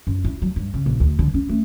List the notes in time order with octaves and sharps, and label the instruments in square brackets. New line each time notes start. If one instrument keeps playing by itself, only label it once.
[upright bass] F#2
E4
F#3
G2
C#3
A#1
D2
D3
C#4
A3